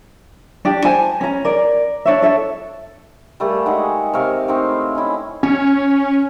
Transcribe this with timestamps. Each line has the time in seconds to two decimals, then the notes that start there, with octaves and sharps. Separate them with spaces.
0.65 D4 G4
0.85 C5 G#5 A5
1.21 C#4 A#5
1.45 A#4 D5
2.06 D4 C#5 E5
2.22 A4 E5
3.40 G3 A3 A#3 G#4
3.66 G#3 D#4 E5 F#5
4.13 C3 A#4 C#5 F5
4.48 A3 C4 D#4 F5
4.70 E4
4.95 C#4 D#4 E4
5.43 C#4